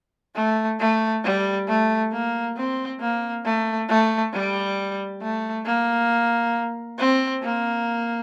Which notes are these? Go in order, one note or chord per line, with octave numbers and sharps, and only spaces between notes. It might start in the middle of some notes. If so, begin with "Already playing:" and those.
A3
A3
G3
A3
A#3
C4
A#3
A3
A3
G3
A3
A#3
C4
A#3